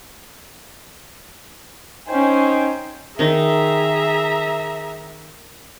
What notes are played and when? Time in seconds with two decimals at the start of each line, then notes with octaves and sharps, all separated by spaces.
2.08 C#4 D#4 C5 G5 G#5
3.19 D#3 D#4 G#4 E5 A#5